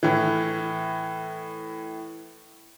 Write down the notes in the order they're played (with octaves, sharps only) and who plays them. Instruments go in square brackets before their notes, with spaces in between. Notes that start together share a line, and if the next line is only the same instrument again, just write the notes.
[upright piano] A2 E3